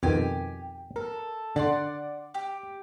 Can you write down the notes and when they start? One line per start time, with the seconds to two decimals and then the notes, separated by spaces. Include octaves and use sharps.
0.03 F2 B2 D#3 G4 G#5
0.96 A4 A#4
1.56 D3 D5 F#5 C6
2.34 G4